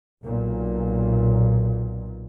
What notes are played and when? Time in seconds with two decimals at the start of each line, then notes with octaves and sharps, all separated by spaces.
0.22 B1 A#2